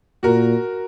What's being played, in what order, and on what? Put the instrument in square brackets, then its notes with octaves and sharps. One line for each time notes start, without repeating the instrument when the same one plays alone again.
[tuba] A#2 [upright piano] F#4 A#4